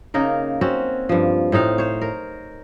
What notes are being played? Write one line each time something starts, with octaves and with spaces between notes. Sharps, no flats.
C#3 A#3 D#4 A#4
C4 C#4 F#4
G2 F3
A2 C4 D#4 F5
C5 C#5
A#4